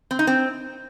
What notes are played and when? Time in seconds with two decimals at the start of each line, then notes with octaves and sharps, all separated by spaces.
0.11 C4
0.19 D#4
0.27 C4